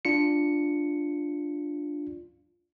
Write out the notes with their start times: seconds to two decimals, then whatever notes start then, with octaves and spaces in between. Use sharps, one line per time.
0.05 D4 F4 C#7